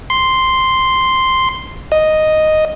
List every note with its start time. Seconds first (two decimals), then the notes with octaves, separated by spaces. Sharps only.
0.10 C6
1.92 D#5